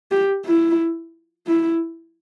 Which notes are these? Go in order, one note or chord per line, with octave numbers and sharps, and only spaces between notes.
G4
E4
E4